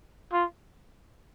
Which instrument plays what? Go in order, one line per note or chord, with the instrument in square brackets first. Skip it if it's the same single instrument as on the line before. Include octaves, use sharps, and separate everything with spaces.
[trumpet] F4